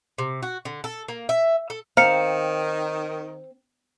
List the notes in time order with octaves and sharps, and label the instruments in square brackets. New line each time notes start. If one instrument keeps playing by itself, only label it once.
[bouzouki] C3
F#4
D3
A4
A#3
E5
A4
[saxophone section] D#3 [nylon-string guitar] C4 [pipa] F5 [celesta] A#5 C#7